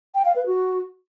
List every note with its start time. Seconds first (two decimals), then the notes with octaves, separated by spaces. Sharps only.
0.15 G5
0.25 F5
0.36 B4
0.46 F#4